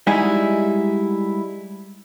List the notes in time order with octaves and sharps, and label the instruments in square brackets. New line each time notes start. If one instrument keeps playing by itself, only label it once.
[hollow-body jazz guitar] G3 G#3 D#4 E4 F#4 G#4